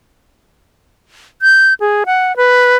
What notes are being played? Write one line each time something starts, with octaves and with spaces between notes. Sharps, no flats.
G6
G#4
F#5
B4